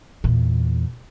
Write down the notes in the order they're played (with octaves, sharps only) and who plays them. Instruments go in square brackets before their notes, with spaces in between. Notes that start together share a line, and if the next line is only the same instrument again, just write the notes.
[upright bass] E2 A#2